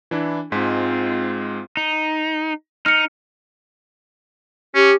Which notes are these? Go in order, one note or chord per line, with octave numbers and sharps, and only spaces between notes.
E3 D4 E4
G#2 G#3 C4 F4 B6
D#4
D#4 F6 C#7
C#4 G4